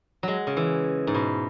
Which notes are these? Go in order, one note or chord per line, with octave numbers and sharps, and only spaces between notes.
F#3 G#3
C#3
E3
G#2
B2